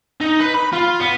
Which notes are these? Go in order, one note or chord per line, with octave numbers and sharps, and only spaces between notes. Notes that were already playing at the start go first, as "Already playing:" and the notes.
D#4
B4
B5
F4
B3